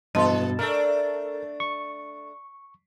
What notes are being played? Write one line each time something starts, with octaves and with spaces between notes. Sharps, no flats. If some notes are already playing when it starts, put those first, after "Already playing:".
G2 B2 E3 A4 D#5 A5 C6
A3 D4 A4 A#4
C#6